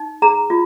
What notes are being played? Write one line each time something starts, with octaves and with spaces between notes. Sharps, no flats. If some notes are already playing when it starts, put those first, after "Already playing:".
Already playing: D#4
G#4 A#5
F4